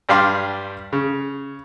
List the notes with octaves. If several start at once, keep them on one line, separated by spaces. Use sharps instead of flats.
G2 G3 D4 F5 C6
C#3